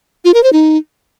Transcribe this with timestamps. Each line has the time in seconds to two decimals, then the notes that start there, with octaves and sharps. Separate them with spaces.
0.25 F4
0.34 A#4
0.43 C5
0.53 D#4